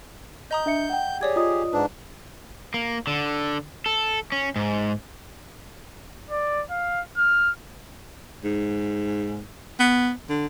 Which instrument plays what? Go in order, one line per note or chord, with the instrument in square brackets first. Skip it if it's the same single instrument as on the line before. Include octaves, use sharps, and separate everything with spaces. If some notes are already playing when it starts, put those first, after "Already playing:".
[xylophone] D#5 A#5 D#6 [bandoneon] G6
[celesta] D4 E5 C#7
F#5 G5
[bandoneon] G4 G#4 [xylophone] C#5 D5 G#6
[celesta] F4 D#5 D#6
[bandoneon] G#2 D4 [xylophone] B4
[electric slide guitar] A#3
D3
A4
C#4
G#2
[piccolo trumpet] D5
F5
F6
[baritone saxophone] G#2
B3
D3